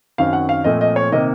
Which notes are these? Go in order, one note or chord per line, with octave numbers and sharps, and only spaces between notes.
F#2 D#3 F#3 C4 F5
F#5
F5
A#2 F3 A3 C4 D#5
D#5
C#5
C3 D#3 A#3 D#5